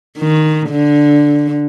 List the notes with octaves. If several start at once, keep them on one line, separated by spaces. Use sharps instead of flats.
D#3
D3